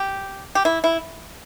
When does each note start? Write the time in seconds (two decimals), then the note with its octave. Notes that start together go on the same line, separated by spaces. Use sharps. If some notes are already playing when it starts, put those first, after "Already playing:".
Already playing: G4
0.55 G4
0.65 E4
0.84 E4